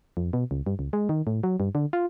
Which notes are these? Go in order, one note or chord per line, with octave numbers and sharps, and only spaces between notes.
F2
B2
C#2
G2
C#2
G#3
D#3
A2
F#3
G2
D3
F4